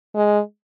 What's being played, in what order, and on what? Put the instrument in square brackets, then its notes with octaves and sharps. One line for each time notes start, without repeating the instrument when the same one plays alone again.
[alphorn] G#3